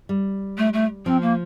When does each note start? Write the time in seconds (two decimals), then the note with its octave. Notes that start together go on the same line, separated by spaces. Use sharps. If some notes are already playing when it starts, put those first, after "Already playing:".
0.09 G3
0.58 A3
0.73 A3
1.06 F3 C4
1.22 A#3